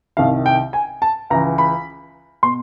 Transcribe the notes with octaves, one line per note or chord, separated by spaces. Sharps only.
C2 C3 D#3 F5
G5
G#5
A5
C#2 C#3 E3 A#5
B5
B2 C6